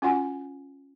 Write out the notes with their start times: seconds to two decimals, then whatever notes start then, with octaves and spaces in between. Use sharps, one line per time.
0.02 C#4 F4 F#4 F#5 G#5 C6